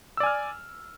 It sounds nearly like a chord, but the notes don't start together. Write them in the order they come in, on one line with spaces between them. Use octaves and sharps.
E6 D5 G#5 F6